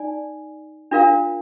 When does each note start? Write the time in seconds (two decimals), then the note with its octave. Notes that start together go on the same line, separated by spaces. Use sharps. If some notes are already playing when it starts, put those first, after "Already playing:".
Already playing: D#4 D5 G#5
0.91 D4 F4 A#4 F5